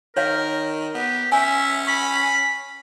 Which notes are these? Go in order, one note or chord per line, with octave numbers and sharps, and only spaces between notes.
D#3 A#4 C#5 F5
B3 G4
C#4 E5 G#5
B5 C#6